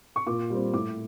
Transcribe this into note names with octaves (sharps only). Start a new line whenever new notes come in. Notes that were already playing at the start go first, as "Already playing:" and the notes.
C#6
A#2 D6
G3 C4
A2 D6